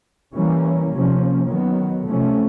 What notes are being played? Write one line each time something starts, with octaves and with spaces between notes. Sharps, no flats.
E3 G3 A#3 C#4
C3 F3 A#3 C#4
D#3 F#3 B3
C3 F3 A3 C#4